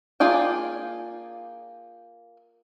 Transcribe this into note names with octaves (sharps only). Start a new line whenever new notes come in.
A#3 F4 G#4 D5 G5